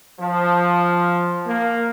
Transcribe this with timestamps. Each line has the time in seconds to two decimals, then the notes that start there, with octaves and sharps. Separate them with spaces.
0.19 F3
1.47 A#3